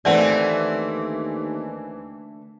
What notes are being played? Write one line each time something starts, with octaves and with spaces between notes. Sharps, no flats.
D#2 D3 E3 A3 A#3 C4 D5 F#5